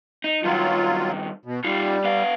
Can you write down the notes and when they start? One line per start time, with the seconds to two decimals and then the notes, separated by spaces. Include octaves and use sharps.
0.24 D#4
0.44 G2 D#3 F#3 F4
1.45 B2
1.64 G3 D#4 F4
2.04 B3 F5